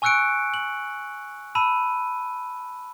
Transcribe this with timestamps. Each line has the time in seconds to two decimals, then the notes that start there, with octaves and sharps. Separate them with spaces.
0.02 G#5 C#6 E6 F#6 C#7 D7
0.54 F#7
1.55 A5 B5 E6 D#7